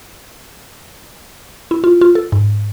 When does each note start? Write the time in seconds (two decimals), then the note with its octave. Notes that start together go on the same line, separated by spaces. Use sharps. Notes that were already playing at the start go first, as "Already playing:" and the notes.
1.71 E4
1.84 F4
2.01 F4
2.15 A4
2.32 G#2